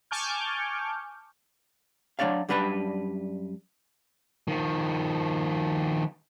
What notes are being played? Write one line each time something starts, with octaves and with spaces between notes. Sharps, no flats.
G#5 A5 C#6 D6 F6 G6
F#3 G#3 D4 C#5 D5 F5
F#2 G3 D4 B4 A#5 B5
D#3 F3